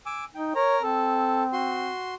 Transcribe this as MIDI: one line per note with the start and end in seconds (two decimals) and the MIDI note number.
0.06 0.25 80
0.06 0.25 86
0.06 0.25 88
0.35 0.55 63
0.35 0.53 79
0.55 0.82 70
0.55 0.77 73
0.55 0.82 82
0.82 1.92 60
0.82 1.44 69
1.53 2.15 66
1.53 2.15 84